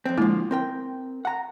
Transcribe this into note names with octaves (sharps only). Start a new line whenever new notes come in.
F2 C4
D3 F3 G#3 A#3 E4
C4 A#4 G5
F#5 A#5